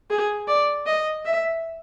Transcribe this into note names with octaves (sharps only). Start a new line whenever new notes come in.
G#4
D5
D#5
E5